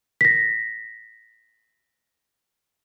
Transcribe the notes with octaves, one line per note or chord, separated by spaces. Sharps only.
A#6 B6